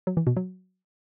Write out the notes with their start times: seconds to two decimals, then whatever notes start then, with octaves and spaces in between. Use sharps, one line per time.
0.07 F#3
0.17 E3
0.27 B2
0.37 F#3